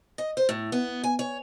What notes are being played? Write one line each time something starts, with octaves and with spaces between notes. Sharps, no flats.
D#5
C5
A2
B3
G#5
C#5